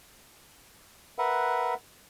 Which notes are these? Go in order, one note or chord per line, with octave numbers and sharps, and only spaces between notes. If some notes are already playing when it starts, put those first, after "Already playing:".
A#4 B4 E5 F#5